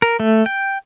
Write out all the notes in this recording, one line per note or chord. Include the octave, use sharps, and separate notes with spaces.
A#4
A3
G5